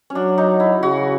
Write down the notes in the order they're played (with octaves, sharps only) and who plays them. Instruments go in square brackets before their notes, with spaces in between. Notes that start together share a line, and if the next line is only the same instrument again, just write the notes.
[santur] C#4
[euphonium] F#3 [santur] D4
[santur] D#4
E4
[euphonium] C#3 [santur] F#4